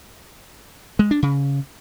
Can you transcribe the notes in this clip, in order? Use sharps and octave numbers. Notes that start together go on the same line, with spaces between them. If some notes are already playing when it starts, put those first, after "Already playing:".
G#3
D4
C#3